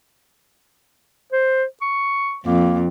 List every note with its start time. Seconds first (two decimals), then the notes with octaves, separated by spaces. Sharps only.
1.32 C5
1.81 C#6
2.46 F2 A#3